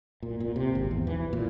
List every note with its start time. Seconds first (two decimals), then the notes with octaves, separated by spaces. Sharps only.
0.23 A#2
0.40 A#2
0.56 C3
0.75 G#1
0.91 E2
1.07 E3
1.33 A#2